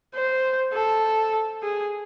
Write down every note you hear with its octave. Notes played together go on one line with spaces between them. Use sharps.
C5
A4
G#4